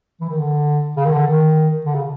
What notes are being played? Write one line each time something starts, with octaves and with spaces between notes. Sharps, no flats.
E3
D#3
D3
C#3
D#3
D3
D#3
D3
C#3